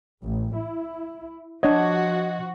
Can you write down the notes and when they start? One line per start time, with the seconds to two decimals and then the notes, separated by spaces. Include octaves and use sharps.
0.21 A1
0.55 E4
1.63 F3 D4 F#4 C#5 D#5 F#5 G#6